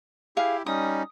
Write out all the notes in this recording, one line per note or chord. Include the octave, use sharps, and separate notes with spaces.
E4 G4 G#4 F5
G3 C#4 D#4 D#6